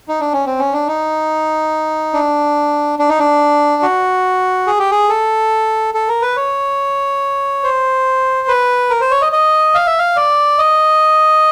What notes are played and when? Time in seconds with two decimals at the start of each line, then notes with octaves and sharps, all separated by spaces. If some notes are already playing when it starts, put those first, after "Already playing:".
0.08 D#4
0.21 D4
0.33 C#4
0.46 C4
0.59 C#4
0.73 D4
0.87 D#4
2.14 D4
2.99 D4
3.09 D#4
3.20 D4
3.83 F#4
4.67 G#4
4.79 G4
4.91 G#4
5.09 A4
5.94 A4
6.08 A#4
6.22 B4
6.37 C#5
7.63 C5
8.48 B4
8.90 A#4
9.01 C5
9.11 C#5
9.22 D#5
9.32 D#5
9.75 F5
9.87 E5
9.99 F5
10.16 D5
10.59 D#5